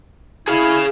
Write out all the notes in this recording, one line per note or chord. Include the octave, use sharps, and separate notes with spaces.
E4 G#4 F5